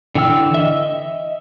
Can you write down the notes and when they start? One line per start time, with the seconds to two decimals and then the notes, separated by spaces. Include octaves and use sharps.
0.15 D3 E3 G5 E6 F6
0.54 D#5 E5